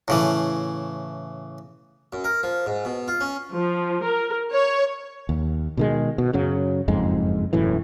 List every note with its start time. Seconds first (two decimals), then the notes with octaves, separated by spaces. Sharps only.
0.08 A2 C#3 E3
2.13 F#2
2.24 A#4
2.43 F3
2.66 G#2
2.85 B2
3.08 F4
3.21 C#4
3.53 F3
4.04 A#4
4.51 C#5
5.29 D#2
5.77 B2 D#3 G#3
6.18 B2
6.33 F#2 C#3 F#3
6.88 F#1 F2 G#2 G#3
7.53 E1 F#2 A2 E3